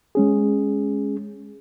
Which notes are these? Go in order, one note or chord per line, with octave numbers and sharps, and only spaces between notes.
G#3 C#4 G#4